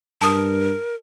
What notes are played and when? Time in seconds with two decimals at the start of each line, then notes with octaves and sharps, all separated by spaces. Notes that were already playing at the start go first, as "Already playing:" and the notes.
0.22 G2 A#4 A5 D#6